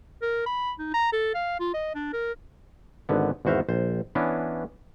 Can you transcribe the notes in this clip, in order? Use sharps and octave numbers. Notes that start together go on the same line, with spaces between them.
A#4
B5
D#4
A#5
A4
F5
F4
D#5
D4
A#4
G#1 D3 B3
G#1 E2 F#4 C5 E5 F5
A#1 C5
E3 B3 C#4 D4